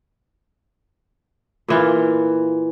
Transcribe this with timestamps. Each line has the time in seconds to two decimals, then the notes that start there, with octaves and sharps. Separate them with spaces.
1.68 A#2 E3 F4